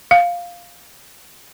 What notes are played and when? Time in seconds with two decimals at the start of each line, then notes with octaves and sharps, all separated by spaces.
0.11 F5